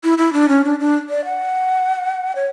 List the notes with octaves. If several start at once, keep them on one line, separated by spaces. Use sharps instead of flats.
E4
E4
D4
C#4
D4
D4
D5
F#5
C#5